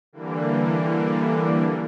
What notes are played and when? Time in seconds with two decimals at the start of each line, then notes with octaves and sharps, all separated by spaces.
0.13 D3 E3 G3 A#3